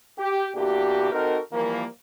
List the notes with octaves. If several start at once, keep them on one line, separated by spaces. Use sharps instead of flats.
G4
B2 A#3 D4 E4 F#4 G4
C4 D#4 F#4 A4 A#4
E3 F3 G3 A#3